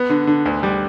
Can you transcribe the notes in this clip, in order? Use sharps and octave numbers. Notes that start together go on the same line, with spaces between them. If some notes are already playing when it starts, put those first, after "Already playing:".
Already playing: B3
D3
D3
D2
G3